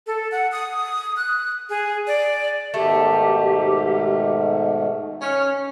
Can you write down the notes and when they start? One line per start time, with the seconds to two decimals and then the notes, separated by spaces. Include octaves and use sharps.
0.07 A4
0.32 F#5
0.52 D#6
1.17 F#6
1.69 G#4
2.07 D5
2.74 G#2 B2 D#3 A3 G4
5.22 C#4